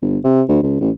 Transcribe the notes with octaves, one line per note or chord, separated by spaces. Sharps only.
G1
C3
D2
C#2
A1